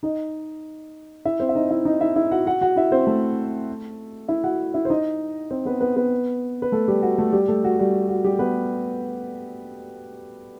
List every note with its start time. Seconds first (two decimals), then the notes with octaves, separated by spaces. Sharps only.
0.03 D#4 D#5
1.25 E4 E5
1.40 C4 C5
1.49 E5
1.55 D#4 D#5
1.70 E4 E5
1.85 D#4 D#5
2.01 E4 E5
2.16 E4 E5
2.31 F#4 F#5
2.46 F#4 F#5
2.61 F#4 F#5
2.76 E4 E5
2.92 C4 C5
3.07 A3 A4
4.28 E4 E5
4.44 F#4 F#5
4.74 E4 E5
4.85 C5
4.90 D#4 D#5
5.51 C4 C5
5.65 B3 B4
5.81 B3 B4
5.96 B3 B4
6.62 B4
6.72 A3 A4
6.88 G3 G4
7.02 F#4
7.18 A3 A4
7.33 G3 G4
7.48 A3 A4
7.64 F#4
7.79 G3 G4
8.09 F#4
8.24 G3 G4
8.39 B3 B4